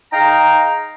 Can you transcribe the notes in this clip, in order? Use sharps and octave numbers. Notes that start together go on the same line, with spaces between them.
D#4 G#4 F5 G5 A#5